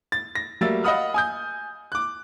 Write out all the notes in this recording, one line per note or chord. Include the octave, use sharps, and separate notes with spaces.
A6
A#6
F#3 G3 A3 A#3 E6 A6
D#5 F5 F#5 B5 D#6 F6
G#5 D#6 G6
D6 F#6